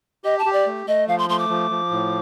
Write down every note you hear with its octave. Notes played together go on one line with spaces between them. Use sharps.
G4 D#5
A5
G4
D5
A3
A3 D#5
F3 F5
C6
A3 C6
D6
F3
F3
A2